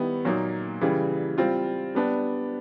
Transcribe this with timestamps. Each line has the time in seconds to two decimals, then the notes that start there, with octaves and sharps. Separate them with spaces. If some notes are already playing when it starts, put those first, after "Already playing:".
Already playing: D#3 G3 B3 E4
0.25 A#2 F#3 A#3 D#4
0.81 C#3 E3 G3
1.38 G3 C4 F4
1.95 G3 B3 D4